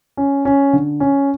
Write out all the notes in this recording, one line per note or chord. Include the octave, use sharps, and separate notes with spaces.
C#4
C#4
D3
C#4